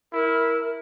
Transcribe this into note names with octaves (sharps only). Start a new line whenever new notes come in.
E4 A#4